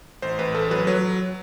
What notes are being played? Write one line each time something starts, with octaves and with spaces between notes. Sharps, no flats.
A1 C5
A1 B4
A1 A4
F#3 B4
F#3